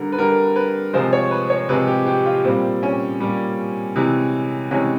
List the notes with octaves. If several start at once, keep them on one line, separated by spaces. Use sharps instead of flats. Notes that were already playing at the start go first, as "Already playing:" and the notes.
Already playing: D3 G3 A#4
B4
D3 G3 A#4
B4
C3 F3 G#3 C5
C#5
B4
C#5
C3 F3 G#3 B4
G4
G4
F4
A#2 G3 C4
C#4
A#2 G3
C3 E3 G#3
C3 E3 G#3 C#4